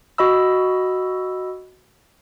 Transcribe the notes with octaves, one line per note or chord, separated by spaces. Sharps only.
F#4 D#5 B5 E6